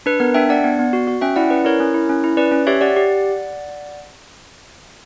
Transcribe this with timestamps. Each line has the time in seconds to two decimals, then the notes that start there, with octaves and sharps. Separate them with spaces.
0.06 D4 B4
0.20 B3 A#4
0.34 D4 E5 G5
0.49 D4 D5 F#5
0.64 B3
0.79 B3
0.93 F#4
1.07 F#4
1.21 C#4 E5 G5
1.36 E4 D5 F#5
1.50 C#4 B4 D5
1.65 E4 A#4 C#5
1.80 C#4
1.94 E4
2.09 C#4
2.24 E4
2.37 C#4 B4 D5
2.52 C#4
2.67 G4 C#5 E5
2.81 G4 D5 F#5
2.96 G4